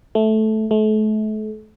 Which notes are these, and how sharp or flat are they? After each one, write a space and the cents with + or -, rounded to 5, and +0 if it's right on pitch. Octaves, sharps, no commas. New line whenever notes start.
A3 -10
A3 -35